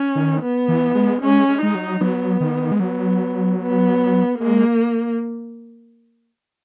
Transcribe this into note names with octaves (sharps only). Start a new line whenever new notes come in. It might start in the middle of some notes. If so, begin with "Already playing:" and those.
Already playing: C#4
D#3
B3
E3
G#3
G#3 C#4
G#3
G#3 D#4
F#3
F#3 B3
D#3
G#3
F#3 B3
B3
G#3 A#3